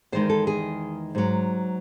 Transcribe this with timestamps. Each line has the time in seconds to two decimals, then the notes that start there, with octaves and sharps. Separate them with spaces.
0.12 E2 D#3 G#3 C5
0.29 A4
0.47 G#4
1.15 G#2 F#3